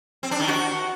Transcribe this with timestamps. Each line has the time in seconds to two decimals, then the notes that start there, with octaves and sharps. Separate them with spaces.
0.23 C4
0.31 D4
0.40 D#3
0.48 F#4